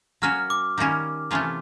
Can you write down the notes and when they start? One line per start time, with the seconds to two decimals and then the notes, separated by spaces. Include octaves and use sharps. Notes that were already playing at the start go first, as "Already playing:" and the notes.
0.22 F#3 A#3 C#4 F#4 F6
0.50 D6
0.78 D#3 G3 A#3 C#4
1.31 C3 E3 A3 C#4 F4